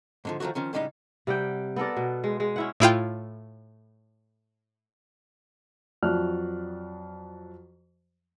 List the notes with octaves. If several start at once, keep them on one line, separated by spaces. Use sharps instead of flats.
G#2 D3 F3
D#3 F3 G#3 A3 F#4
D#3 F3 C#4
A2 C#3 G3 G#3 C4 D#4
C3 G3 F#5 G5
B3 A4 A#4 D5
B2
G#3
G#3
C#4 E4 F#5
A2 E4 F4 G5
F2 F3 F#3 D5 F6 F#6